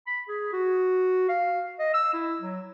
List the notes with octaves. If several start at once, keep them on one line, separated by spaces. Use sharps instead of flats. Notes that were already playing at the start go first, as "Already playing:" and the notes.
B5
G#4
F#4
F5
D#5
E6
E4
F#3